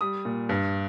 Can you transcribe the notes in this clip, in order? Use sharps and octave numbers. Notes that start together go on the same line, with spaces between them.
G3 D#6
A#2
G2